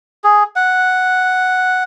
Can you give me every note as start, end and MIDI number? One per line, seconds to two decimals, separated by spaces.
0.24 0.43 68
0.56 1.84 78